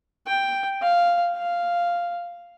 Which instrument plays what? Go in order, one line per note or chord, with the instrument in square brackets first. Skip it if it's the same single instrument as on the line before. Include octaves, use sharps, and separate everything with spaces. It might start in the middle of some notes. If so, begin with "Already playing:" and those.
[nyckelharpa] G5
F5
F5